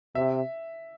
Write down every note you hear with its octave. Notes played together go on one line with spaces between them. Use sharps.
C3 E5